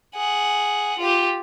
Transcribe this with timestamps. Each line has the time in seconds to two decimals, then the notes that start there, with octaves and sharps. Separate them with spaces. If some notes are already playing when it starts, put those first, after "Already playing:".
0.16 G#4 F#5
0.98 F4 G4